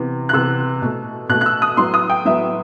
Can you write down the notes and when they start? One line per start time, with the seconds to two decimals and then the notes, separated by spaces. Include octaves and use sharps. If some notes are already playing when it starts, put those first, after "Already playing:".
Already playing: C3 E3 B3
0.29 F#6
0.33 C3 E3 B3 E6
0.82 B2 A3
1.29 B2 F#6
1.34 A3
1.41 F#6
1.46 E6
1.62 D#6
1.77 A2 F#3 B3 C6
1.94 D#6
2.09 G5
2.25 A2 F#3 B3 E5